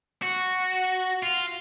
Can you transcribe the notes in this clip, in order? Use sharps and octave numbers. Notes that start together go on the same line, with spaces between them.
F#4
F4